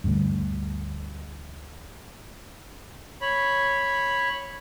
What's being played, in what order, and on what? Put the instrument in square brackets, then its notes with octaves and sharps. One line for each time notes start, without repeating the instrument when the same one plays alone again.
[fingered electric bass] D2 G2
[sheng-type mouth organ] C#5 B5